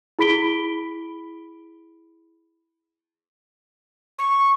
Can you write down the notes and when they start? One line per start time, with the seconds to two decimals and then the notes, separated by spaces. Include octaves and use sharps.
0.19 E4 G#4 B5 B6 D7 G7
4.19 C#6